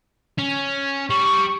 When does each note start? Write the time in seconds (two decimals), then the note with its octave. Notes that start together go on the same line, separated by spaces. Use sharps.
0.39 C#4
1.10 G3 C#6